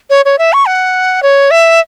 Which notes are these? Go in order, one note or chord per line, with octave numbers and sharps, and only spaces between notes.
C#5
C#5
E5
C#6
F#5
C#5
E5